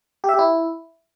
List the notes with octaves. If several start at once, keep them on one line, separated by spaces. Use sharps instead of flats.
G4
E5
G4
E4